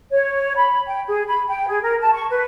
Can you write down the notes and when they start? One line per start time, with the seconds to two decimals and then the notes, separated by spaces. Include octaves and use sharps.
0.11 C#5
0.56 B5
0.87 G5
1.07 G#4
1.28 B5
1.48 G5
1.68 G#4
1.82 A#4
2.00 A5
2.13 C#6
2.29 B4